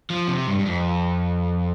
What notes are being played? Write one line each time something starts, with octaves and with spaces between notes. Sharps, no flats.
F3
C3
G2
G2
F2